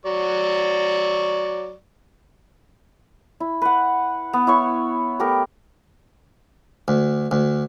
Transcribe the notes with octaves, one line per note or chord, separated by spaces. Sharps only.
F#3 D5 C#6
E4
B4 F#5
B3
E4 C#5 C#6
A3 B3 G4 A#4
D2
D2